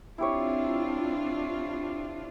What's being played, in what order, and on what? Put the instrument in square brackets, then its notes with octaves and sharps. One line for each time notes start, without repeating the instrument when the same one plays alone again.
[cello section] C4 D4 F4 [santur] E4 G4 C#5